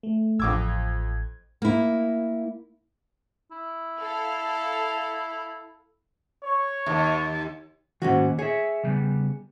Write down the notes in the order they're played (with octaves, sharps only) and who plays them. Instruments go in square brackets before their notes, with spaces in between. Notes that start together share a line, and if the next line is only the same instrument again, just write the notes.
[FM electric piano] A3
[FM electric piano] A1 G#6 [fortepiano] F2 D6 E6
[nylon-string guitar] A#3 E4
[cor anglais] E4
[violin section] A4 F5
[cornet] C#5 [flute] C#6
[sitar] D#2
[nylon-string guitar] G#2 C#4 F#4 [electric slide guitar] D#3 A#3
[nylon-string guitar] G#4 [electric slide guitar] C#5 E5
[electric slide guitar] C#3 G3 B3